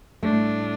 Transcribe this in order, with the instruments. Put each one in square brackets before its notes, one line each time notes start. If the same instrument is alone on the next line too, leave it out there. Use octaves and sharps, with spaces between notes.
[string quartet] A2 G3 D4 [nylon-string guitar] A3